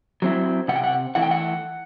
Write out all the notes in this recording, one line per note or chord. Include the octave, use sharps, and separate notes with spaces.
F#3 C4 E4
C3 F#5
G5
F#5
E3 A3 E4 F#5
G5
F#5